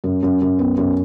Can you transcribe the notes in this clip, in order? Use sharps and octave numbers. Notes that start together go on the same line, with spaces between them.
F#2
F#2
F#2
B3
F#2